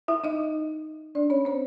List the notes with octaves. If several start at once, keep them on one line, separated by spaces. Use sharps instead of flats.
E4 E5
D#4 D#5
D4 D5
C#4 C#5
C4 C5